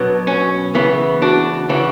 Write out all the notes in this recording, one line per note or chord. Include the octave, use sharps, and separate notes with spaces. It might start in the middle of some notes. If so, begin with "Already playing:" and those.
Already playing: B2 F#3 B3 D4
C#4
C#3 E3 B3
D4 F#4
C#3 E3 D4 F#4